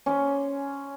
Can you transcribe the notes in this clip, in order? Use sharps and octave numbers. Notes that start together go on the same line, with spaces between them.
C#4 C6 D6